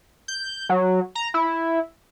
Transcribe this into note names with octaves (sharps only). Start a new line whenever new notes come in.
G6
F#3
A#5
E4